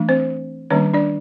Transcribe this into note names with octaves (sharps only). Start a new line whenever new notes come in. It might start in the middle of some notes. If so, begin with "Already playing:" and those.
Already playing: E3 A3 D4
C4 C5
D#3 G3 A#3 C#4 D4 C#5
D4 D5